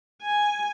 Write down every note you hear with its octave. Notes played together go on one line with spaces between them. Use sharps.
G#5